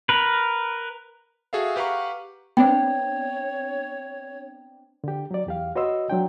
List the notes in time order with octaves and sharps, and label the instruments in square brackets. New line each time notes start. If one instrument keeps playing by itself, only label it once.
[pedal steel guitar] A#4 B4
[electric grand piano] F#4 G#4 A4 E5 F5
G4 B4 F5 F#5 A#5 C#6
[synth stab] B3 C4 D4 [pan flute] C#5 [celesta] G5
[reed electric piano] D3 G4
F#3 D5
E2 G4 F5
F#4 B4 C#5 D#5 C6 E6
F#3 D4 G5